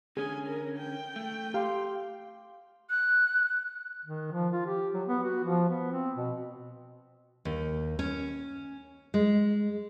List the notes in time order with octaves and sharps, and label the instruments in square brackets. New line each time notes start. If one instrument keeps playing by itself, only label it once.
[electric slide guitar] D3 C#4 [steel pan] G#4 [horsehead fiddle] G#5
[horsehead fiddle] A#4
G5
[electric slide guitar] A3
[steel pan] G4 [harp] F5 C6
[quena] F#6
[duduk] D#3
F3
F4
G4
F#3
B3
F#4
F3
B3
C4
B2
[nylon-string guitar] D#2
C#4
G#3